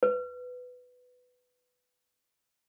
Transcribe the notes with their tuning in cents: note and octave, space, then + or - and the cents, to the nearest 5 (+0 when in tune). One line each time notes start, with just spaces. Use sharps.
B4 +10